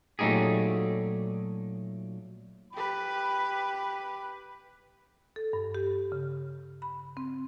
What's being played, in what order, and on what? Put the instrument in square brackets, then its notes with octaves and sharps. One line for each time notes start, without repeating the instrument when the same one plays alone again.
[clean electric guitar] A#2 F#3 A3 D#4 G4 G#4
[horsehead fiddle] G4 B4 [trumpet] B5
[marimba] A4
G2
G4
C#3
B5
C4